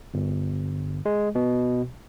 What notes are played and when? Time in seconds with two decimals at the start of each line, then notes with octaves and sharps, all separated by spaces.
0.14 G1
1.06 G#3
1.35 B2